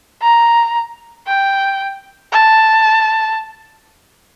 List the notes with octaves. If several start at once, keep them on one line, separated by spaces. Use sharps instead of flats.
A#5
G5
A5